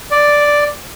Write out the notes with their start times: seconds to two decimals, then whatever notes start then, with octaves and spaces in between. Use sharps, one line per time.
0.11 D5